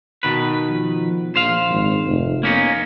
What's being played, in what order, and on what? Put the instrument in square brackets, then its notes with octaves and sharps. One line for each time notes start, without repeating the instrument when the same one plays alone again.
[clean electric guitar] B2 D#3 B4
[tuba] F3
[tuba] A#1 [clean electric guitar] C5 F5
[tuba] G#1
F1
[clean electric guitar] A#3 C#4 D#4 [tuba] B3